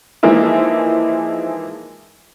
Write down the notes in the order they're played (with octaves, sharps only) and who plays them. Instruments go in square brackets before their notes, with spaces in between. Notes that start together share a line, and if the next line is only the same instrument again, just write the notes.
[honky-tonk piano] E3 F3 G#3 A#3 D#4 E4